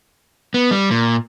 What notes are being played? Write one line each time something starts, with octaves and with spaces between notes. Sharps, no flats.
B3
G3
A#2